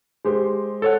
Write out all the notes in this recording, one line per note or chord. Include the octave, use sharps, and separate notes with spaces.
G#3 G4 C5
A4 C#5 F#5